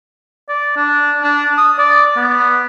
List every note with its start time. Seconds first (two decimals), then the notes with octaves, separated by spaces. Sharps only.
0.48 D5
0.76 D4
1.22 D4
1.58 D#6
1.78 D5
2.17 B3